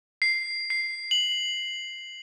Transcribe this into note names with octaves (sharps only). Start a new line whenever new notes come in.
C7
C7
F#7